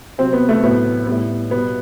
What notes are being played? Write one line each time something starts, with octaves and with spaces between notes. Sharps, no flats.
C3 F#3 C4
B3
A3
A2 F#3 B3
A2 G3 B3
B2 G3 B3